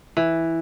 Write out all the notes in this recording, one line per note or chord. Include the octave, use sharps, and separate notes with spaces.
E3